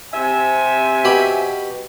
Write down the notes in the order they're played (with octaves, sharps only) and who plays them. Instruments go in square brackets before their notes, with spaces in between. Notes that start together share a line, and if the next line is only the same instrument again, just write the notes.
[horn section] C3 E5 G#5
[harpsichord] B2 G4 B5